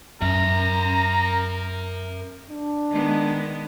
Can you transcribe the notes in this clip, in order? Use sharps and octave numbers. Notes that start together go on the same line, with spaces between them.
F#2 A#4 E5 A#5
D4
D#3 G#3 B3